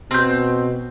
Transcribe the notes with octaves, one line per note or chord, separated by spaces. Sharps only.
B2 C4 G6